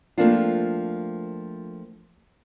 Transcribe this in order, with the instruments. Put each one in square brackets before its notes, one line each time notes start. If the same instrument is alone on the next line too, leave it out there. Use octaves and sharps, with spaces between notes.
[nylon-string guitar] F3 A3 A#3 C4 D4 F4